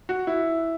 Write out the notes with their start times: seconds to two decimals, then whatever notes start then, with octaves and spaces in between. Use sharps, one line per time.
0.09 F#4
0.27 E4